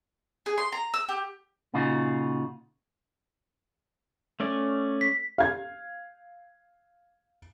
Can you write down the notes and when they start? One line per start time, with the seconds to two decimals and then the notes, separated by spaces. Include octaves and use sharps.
0.46 G#4
0.58 C6
0.72 A#5
0.94 E6
1.09 G4
1.74 A#2 C#3 D#4 F4 F#4
4.40 A3 C#4 D5
5.01 B6
5.38 F5 G#6